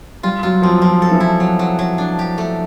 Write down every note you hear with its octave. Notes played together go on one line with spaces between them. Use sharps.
G3 F4
F#3 F4
F3 C4
F3 C4
A4
E3
E4
F#3
F#3
F#3
D4
G4
A3